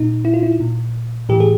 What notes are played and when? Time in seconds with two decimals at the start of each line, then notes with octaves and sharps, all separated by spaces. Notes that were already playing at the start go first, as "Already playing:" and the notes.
Already playing: A#2 D#4
0.25 E4
0.34 F4
0.43 E4
0.60 A#2
1.29 A2 E3 G4
1.40 G#4